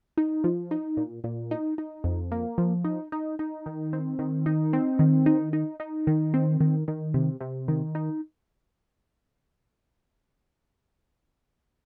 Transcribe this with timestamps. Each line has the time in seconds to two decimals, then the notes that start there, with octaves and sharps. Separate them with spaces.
0.18 D#4
0.44 F3
0.71 D#4
0.97 A#2
1.24 A#2
1.51 D#4
1.78 D#4
2.04 F2
2.32 A#3
2.58 F3
2.85 D#4
3.12 D#4
3.39 D#4
3.66 D#3
3.93 C4
4.19 D#3
4.46 D#4
4.73 C4
4.99 D#3
5.26 D#4
5.53 D#4
5.80 D#4
6.07 D#3
6.34 C4
6.61 D#3
6.88 D#3
7.14 C3
7.41 C3
7.68 D#3
7.95 D#4